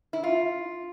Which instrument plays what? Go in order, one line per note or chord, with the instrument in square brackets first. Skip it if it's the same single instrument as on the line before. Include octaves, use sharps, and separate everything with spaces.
[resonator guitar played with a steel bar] E4
F4